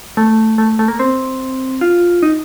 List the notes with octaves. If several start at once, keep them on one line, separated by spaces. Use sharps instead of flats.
A3
A3
A3
A#3
C4
F4
D#4